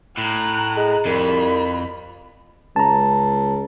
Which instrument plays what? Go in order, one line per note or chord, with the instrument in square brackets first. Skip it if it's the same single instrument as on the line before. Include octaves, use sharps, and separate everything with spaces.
[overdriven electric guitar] A2 [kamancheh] A#5 F#6
[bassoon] G#3
[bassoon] C2 [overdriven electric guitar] F2 [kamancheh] B5
[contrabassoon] C#2 [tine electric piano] A5 A#5